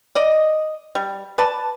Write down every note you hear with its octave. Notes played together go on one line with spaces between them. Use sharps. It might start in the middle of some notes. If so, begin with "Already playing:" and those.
D5 D#5
G3
B4 D5 A5